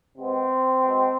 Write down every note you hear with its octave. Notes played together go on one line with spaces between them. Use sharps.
C3 G#3 B3 C4
B2 G#3 B3